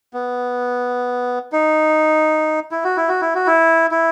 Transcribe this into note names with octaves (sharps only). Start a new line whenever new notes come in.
B3
D#4
E4
F#4
E4
F#4
E4
F#4
E4
E4